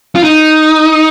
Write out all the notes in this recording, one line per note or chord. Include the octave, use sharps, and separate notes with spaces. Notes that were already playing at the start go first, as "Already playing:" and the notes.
F4
D#4